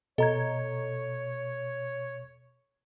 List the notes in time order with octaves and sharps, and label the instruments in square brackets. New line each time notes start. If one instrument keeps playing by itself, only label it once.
[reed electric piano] B2 [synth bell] A4 A#5 G#6 [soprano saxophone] C#5 [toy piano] D#5